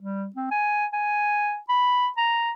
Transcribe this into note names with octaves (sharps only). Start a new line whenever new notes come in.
G3
C4
G#5
G#5
B5
A#5